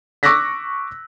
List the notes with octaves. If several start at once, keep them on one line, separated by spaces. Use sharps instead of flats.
C#6 D6 E6 F#6 A#6 B6